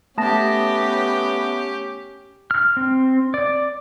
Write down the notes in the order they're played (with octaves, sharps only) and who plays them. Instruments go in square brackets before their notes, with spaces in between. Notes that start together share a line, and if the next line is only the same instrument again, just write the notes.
[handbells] A3 A5 A#6 [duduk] B3 [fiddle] C#4 G4
[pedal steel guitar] F6
C4
D5